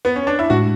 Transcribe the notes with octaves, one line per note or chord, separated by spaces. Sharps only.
B3
C#4
D4
E4
A2 G#3 D4 F#4